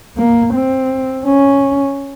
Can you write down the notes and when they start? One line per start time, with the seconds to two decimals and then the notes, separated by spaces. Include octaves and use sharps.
0.17 A#3
0.53 C4
1.26 C#4